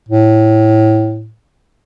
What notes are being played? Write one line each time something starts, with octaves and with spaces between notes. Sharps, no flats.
A2